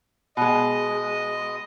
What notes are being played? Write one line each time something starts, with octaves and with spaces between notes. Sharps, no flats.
B2 G#3 D#5